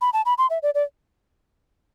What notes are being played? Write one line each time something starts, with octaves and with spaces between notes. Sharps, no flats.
B5
A5
B5
C6
E5
D5
D5